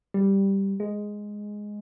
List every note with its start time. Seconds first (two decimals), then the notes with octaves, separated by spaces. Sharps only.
0.14 G3
0.80 G#3